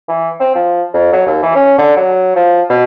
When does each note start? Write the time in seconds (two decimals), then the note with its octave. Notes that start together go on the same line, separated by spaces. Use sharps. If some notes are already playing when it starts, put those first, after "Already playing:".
0.08 E3
0.40 C4
0.55 F3
0.94 F2
1.12 F#3
1.27 D#2
1.43 E3
1.55 C#4
1.78 D3
1.97 F#3
2.36 F3
2.70 B2